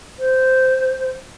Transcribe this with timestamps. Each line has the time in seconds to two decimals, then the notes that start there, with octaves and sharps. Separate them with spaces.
0.19 C5